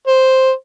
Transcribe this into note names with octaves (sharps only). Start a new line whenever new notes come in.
C5